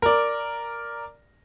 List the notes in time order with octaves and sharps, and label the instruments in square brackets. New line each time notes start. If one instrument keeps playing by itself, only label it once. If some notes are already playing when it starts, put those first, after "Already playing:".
[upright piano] A#4 D5